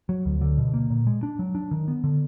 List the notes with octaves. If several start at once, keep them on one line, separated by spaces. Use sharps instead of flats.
F#3
D2
D3
B2
A#3
A#2
G#3
D4
F#3
D4
D#3
B3
D3